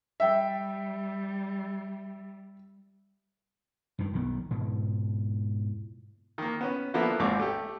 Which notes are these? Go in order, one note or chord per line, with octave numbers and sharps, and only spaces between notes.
G3 E5 G5
G2 D#3
B1 D#3 F3 B3
G#2 B2
D#3 A#3
B3 C#4
D3 F3 A#3 B3 E4
G#1 D#2 G#2 C4 D6
A3 G4